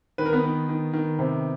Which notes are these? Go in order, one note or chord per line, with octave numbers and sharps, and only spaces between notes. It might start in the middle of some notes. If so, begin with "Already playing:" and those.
D#3 B4
A#4
B3 B4
D#3
D#3
D#3
C3